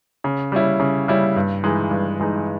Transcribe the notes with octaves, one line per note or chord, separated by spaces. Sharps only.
C#3
G3 C#4 E4
C#3
G3 C#4 E4
G2
E3 G#3 D#4
G2
E3 G#3 D#4